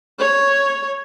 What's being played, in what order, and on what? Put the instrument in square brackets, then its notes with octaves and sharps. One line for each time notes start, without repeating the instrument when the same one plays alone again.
[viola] C#5